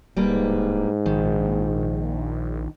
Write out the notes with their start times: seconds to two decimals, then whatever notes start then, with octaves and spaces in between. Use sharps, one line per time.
0.16 D1 G#2 G3 A#3 B4
1.06 A#1 D#3